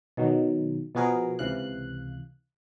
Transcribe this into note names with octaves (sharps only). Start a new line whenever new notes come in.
B2 D#3 F#3
B2 F3 B3 F#4 G#4 A#4
C#2 C3 E3 F5 F#6